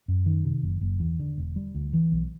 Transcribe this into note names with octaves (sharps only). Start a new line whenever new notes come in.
F#2
D#3
C3
F#1
F#1
E2
D3
E1
G3
D2
E3
B1